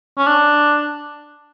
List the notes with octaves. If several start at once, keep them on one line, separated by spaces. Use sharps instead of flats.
C#4
D4